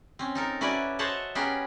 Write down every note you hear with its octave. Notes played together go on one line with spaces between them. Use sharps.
C4 C#4
D#4 A4 A#4
C#4 E4 F#4 B4 D5
C5 C#5 D#5 E5 F#5 A5
B3 C#4 G4 G#4 A#4